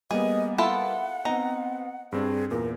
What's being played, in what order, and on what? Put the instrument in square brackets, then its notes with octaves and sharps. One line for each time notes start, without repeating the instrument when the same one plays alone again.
[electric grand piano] G3 A#3 B3 [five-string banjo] G#4 [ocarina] D#5
[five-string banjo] E4 F4 A4 [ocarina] F#5
[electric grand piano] B3 C4 [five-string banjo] D#4 A#5
[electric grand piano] G2 C4 D4 [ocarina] G#4
[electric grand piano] E2 A#2 [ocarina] A#4